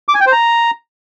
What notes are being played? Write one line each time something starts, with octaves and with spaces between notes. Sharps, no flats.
D6
G#5
G5
C5
A#5